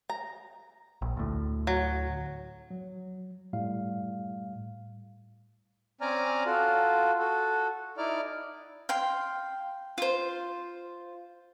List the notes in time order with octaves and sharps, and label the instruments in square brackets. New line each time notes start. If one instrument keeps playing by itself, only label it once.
[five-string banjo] A#5
[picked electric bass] A#1
D2 A2
[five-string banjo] F#3
[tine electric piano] F#3
A2 G3 F5
[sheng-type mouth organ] C4 C#4 D5 G#5 A#5 F6
F4 F#4 A4
F#4 A4
D#4 E4 D5 F6
[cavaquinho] F5 G5 C6
F4 C5